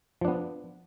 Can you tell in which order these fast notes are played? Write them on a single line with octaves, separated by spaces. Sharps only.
F3 D4 B3